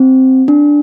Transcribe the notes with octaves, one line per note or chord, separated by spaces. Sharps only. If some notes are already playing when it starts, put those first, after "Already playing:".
Already playing: C4
D4